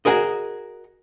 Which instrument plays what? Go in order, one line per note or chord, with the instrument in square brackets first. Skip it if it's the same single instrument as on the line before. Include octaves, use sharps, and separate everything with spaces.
[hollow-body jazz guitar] F#4 G#4 A#4 D#5